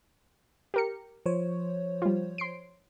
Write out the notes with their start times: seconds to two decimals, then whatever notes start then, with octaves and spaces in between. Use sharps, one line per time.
0.74 G4 A#4 C#7
1.26 F3 C5 C#5
2.02 G3 F4
2.38 C6 C7 D7